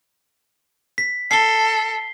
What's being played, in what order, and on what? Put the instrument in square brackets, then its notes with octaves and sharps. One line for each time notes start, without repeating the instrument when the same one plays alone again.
[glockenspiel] B6
[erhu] A4 [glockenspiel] C7 G7